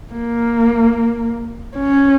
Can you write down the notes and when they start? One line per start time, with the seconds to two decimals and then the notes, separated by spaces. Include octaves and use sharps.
0.14 A#3
1.77 C#4